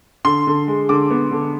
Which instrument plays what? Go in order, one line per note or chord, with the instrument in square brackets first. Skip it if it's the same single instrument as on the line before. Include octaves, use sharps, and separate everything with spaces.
[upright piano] D3 C6
D3
G#3
D3 D6
B3
D3